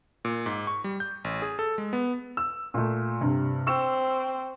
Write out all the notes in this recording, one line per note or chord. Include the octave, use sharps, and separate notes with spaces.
A#2
G#2
C#6
G3
G6
A1
G#4
A4
G#3
B3
E6
A#2 A3
G2 C3
C4 C#6 E6 E7